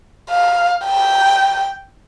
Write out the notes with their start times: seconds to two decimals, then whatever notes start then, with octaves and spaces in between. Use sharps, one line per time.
0.30 F5
0.85 G5